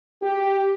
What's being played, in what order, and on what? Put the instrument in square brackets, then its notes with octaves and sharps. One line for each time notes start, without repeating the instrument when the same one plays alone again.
[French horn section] G4